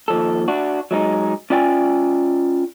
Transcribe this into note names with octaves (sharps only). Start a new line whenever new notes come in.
D#2 F3 A4
D4 F#4
F#3 G#3 D#4
C#4 F4 D5 G5 G#5